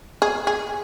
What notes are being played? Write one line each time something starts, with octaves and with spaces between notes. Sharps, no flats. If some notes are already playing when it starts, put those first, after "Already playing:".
G#4
G#4